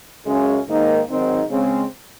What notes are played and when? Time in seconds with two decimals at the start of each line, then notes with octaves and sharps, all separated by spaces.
0.25 F#2 C#3 G#3 C#4
0.67 G#2 D#3 A#3 D#4
1.09 G#2 D#3 F#3 C4 D#4
1.50 C#3 G#3 C4